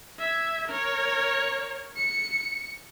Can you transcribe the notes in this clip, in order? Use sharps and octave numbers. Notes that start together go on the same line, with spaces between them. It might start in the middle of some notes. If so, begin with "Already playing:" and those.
E5 G#6
A#4 C#5
C#7